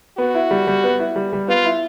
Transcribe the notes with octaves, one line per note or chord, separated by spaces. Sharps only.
B3 F#4
E4
G3
G3
B3
E4
G3
G3
B3 F4
E4